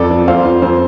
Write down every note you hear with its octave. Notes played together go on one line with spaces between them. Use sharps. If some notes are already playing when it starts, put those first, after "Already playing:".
Already playing: F2 A4 D5
F3
F2 C5 F5
F3
F2 C5